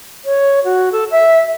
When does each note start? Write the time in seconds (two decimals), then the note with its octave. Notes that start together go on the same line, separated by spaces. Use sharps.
0.25 C#5
0.65 F#4
0.92 A4
1.11 E5